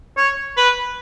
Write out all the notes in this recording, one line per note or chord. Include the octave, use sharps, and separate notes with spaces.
C#5
B4